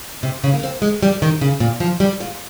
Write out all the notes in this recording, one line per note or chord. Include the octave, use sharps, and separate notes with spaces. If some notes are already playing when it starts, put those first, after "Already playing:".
C3
C#3
A#3
C4
G#3
G3
D#3
C#3
A#2
F3
G3
A#2